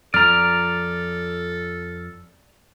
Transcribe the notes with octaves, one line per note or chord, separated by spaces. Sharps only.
F2 F3 A4 D5 A#5 F6